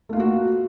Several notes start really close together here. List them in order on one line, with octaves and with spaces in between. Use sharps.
A3 F4 A#3 F#4